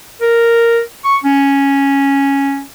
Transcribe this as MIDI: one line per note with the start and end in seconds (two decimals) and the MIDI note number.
0.21 0.81 70
1.04 1.16 85
1.24 2.63 61